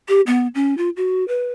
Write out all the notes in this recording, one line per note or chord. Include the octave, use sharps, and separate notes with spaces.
G4
B3
C#4
F4
F#4
B4